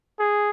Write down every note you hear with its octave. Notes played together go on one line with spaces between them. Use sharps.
G#4